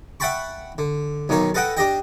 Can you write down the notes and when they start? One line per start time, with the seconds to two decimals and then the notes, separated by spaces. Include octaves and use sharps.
0.20 E5 F#5 G5 A5 B5 C#6
0.78 D3
1.29 B1 D#3 D#4 C#5
1.54 A4 B4 D#5 F#5 G5
1.77 D4 G4 D#5 G5